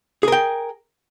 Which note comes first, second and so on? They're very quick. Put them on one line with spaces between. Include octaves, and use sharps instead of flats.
G#4 A#4 G5